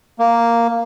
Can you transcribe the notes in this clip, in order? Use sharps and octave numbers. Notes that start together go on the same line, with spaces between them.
A#3